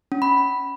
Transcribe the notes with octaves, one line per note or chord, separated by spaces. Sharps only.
C#4
B5